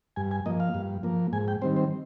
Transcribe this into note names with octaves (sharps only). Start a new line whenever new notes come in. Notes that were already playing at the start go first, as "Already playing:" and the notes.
G2 G#5
G#5
F3 A#3 D#5
F5
G2
F3 A#3
G#2 G#5
G5
D#3 G3 C4 C5
C5